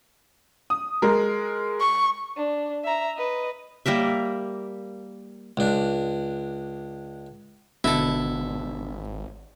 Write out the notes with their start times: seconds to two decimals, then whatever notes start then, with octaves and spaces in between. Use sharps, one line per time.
0.70 D#6
1.02 G#3 A#4
1.80 C#6
2.37 D4
2.84 E5 A#5
3.17 B4 D#5
3.86 G3 A#3 A#4 E5
5.57 C#2 D4
7.84 G#1 B2 D3 E4 A4